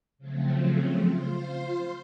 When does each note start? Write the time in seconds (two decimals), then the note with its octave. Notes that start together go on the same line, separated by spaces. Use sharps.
0.18 C#3 F3 F#3 A3 C4
1.05 F4 C5 C6